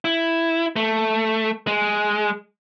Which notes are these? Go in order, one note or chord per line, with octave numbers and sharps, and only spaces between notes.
E4
A3
G#3